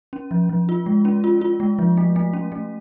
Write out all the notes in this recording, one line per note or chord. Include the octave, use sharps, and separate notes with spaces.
C#4
F3
F3
F4
G#3
C#4
F4
F4
G#3
F3
A3
A3
C#4
A3